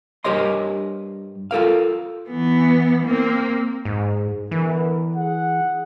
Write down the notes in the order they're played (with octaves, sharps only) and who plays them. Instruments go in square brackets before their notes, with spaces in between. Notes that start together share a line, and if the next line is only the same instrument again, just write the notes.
[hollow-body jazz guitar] G2 G4 A#4 C#5 D#5 C6
F4 A4 A#4 F5
[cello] E3 B3
A#3 C4
[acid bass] G#2
[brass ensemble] D3 B3 A#4 [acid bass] E3
[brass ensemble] G#4 F#5